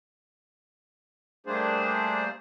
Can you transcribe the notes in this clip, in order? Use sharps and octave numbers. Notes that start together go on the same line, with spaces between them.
G3 A3 A#3 D4 G#4 C5